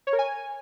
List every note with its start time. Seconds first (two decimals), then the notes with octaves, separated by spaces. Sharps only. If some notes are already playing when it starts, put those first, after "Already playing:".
0.07 C#5
0.13 A#4
0.19 G#5